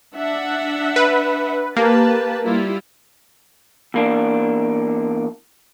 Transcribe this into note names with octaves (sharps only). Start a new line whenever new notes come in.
D4 E5 F#5
B4
A#3 G4 B4 A5
G3 E4 F4
E2 A#3 D4